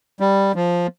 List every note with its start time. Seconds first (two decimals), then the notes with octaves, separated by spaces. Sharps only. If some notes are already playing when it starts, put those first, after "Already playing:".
0.20 G3
0.55 F3